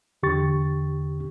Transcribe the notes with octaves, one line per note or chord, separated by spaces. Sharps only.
E2 D3 G4 C#6 A6